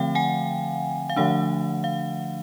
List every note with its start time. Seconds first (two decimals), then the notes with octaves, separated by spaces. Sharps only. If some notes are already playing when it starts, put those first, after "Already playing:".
Already playing: D3 F3 A3 C4 F5 G5
0.15 F#5 G#5
1.10 F5
1.16 D3 F3 A3 D4 F#5
1.84 F5